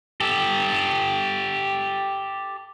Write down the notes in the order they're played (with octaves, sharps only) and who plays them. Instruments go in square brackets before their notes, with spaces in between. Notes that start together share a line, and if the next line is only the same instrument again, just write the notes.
[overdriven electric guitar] G4 A4